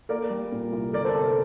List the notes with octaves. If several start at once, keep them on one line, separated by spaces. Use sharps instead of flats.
A#3 A#4 D5
G3
A#2
C2
G1 A#4 D5
A4 C5
C3 A4
A#4